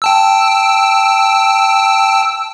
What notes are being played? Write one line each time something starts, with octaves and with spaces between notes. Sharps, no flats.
G5 A5 E6